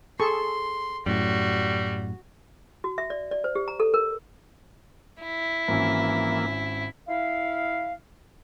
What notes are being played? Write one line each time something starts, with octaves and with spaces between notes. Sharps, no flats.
G#4 A4 C6 C#6
F#2 A2 G3 F#4
F#4
E5
D5
D5
C5
G4
A#5
A4
A#4
E4
G#1 E3 A#3 C#4
E4 F5